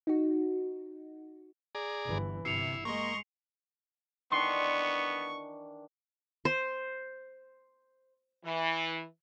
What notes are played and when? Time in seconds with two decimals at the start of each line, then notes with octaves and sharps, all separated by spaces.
0.07 D#4 F#4
1.75 G#4 D5 A#5
2.06 G1 E3
2.45 G1 C3 E4 C7 C#7 F7
2.85 G#3 A#3 D#5 C6 C#6
4.32 D#3 E3 B3 D4 C6 C#6
6.45 C5
8.45 E3